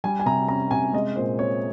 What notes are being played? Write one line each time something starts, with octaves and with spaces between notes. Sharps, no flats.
G3 G#5
G#5
C3 A#5
C#4 A#5
C3 G#5
G#3 D#5
A#2 C5
C4 C#5